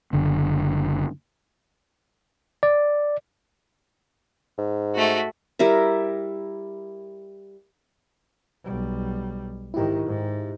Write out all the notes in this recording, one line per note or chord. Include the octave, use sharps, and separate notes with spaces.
F#1 D3
D5
G#2
A3 F#4
G3 E4 A#4 E5
B1 G3
G#2 D#3 E4 G4
G#2